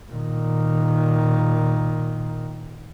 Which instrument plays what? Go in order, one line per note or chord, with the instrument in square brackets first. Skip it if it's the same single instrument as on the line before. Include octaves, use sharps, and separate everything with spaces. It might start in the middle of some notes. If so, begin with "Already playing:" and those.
[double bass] A#2 D#3